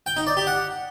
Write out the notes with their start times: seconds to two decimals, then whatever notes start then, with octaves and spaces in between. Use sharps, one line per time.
0.06 G5
0.17 D#4
0.27 D5
0.37 G4
0.47 F#5